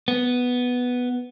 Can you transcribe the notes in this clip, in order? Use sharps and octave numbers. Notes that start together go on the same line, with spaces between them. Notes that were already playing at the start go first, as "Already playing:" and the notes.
B3